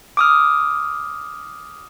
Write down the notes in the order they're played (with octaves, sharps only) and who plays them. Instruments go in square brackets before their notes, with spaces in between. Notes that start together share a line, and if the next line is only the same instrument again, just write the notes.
[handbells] D6 D#6 F6